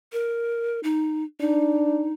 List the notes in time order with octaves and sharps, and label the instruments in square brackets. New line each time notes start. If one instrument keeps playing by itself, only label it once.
[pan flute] A#4
D#4
[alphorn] D4 [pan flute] D#4